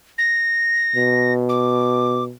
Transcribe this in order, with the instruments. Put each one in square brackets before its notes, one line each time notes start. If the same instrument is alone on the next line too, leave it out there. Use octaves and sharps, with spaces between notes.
[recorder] A#6
[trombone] B2
[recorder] D6